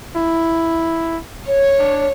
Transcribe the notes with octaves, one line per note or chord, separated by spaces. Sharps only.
E4
C#5
D4